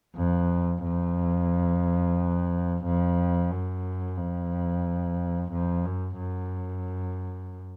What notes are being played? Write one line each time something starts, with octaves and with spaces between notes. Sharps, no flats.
F2
F2
F2
F#2
F2
F2
F#2
F#2